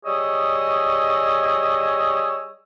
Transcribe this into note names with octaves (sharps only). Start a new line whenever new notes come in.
G3 G#4 C#5 D#5 E6